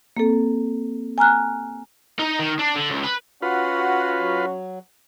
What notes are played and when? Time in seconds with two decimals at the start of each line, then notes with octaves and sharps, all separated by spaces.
0.17 A#3 C4 A4
1.18 G#5 A#5 F6 F#6
2.19 D#4
2.40 D#3
2.59 D4
2.76 D3
2.90 C#2
3.04 B4
3.42 C#4 F4 F#4 B4 F#5
4.19 F#3